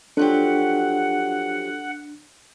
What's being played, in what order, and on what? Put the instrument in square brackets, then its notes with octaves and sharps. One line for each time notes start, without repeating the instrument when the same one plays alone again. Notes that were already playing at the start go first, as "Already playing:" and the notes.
[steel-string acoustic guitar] F3 F#3 G4 [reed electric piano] D4 [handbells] A4 [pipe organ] F#5